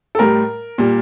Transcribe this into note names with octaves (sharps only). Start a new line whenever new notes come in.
A4
A2 G3 A#4
A#2 G3